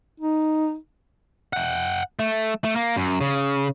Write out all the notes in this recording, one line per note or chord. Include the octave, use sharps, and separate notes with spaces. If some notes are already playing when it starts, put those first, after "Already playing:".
D#4
F#5 G5
A3
A3
A#3
F#2
C#3